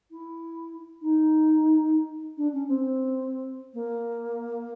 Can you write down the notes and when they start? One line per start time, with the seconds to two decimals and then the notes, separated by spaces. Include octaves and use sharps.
0.11 E4
1.02 D#4
2.37 D4
2.52 C#4
2.68 C4
3.73 A#3